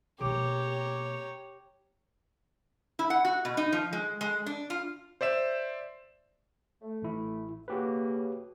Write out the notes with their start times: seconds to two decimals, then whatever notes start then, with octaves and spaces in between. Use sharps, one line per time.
0.21 B2 A#3 G4 C#5 A#5 D6
2.99 E4
3.10 F#5
3.25 F#4
3.45 B2
3.57 D#4
3.72 F3
3.93 G#3
4.21 G#3
4.46 D4
4.70 F4
5.21 C5 D5 E5 E7
6.82 A3
7.02 A1 E4
7.68 C#3 A#3 F#4 G4 B4